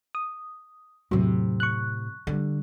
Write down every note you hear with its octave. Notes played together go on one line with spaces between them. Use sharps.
D#6
E2 A2 C3 F#3
C#6 F#6
D3 G3